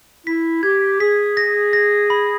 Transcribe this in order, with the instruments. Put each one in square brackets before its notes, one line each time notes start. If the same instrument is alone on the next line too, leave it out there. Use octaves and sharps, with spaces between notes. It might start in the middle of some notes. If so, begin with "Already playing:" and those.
[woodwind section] E4 [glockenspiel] B6
[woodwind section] G4 [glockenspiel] G#6
[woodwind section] G#4 [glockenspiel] B6
[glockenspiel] A#6
A#6
B5